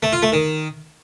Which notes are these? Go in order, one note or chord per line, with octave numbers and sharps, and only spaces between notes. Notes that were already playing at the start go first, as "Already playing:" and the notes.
A3
F4
A3
D#3